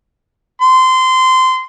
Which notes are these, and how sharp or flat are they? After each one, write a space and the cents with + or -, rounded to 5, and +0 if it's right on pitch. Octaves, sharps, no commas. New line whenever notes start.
C6 -20